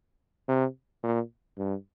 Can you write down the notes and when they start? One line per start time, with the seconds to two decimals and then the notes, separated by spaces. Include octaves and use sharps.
0.48 C3
1.03 A#2
1.58 G2